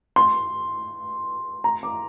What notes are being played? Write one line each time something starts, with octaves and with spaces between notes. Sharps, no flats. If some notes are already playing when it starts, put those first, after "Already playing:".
C6
A#5
D6